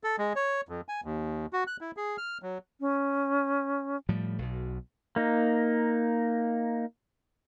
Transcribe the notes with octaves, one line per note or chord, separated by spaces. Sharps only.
A4
G#3
C#5
F2
G#5
D#2
F#4
F#6
E4
G#4
F6
F#3
C#4
A2 F3 G3
B1 B2
A#3 D#4